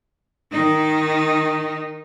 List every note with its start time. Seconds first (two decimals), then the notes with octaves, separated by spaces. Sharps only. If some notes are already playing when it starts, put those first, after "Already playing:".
0.52 D#3 D#4